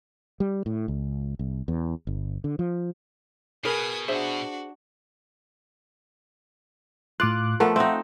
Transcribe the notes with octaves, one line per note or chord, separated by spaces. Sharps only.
G3
A2
C#2
C2
E2
G1
D3
F3
B2 G#4 A#4 B4 G#5 D#6
D4 F#4 G#4 C5 E5
A2 F4 D6 F#6
F3 A3 B3 A#4 F#5
C4 D#4 E5 F#5